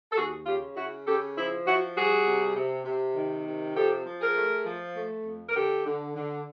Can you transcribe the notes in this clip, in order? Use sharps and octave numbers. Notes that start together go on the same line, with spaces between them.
A4
D#2 F#4 G#4
C#3 F4 G4
C#3 E4 F#4
C#3 G4 A4
F3 E4
F3 E4 F#4
G3 F#4 G#4
C3
C3
C3
D#3
C3
F3 G4 A4
F3
G#4 A#4
A3
F3
A3
F2
A#4
D3 G4 A4
D3
D3